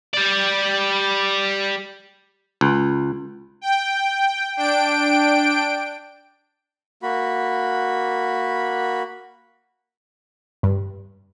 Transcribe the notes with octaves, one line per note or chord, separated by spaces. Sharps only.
G3 D5
C#2
G5
D4 G5 D7
A#3 F#4 B5
G2